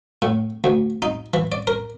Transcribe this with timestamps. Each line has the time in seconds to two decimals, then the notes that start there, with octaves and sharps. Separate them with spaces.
0.22 A2
0.64 D2
1.02 D#4
1.34 E3
1.52 D5
1.67 A#4